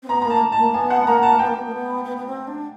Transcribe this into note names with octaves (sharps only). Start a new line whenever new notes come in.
C4
B3 A#5
A#5
A#3 A5
A5
A#3
B3 G#5
F#5
A#3 A#5
A5
B3 G5
A#3
B3
A#3
B3
B3
B3
C4
D4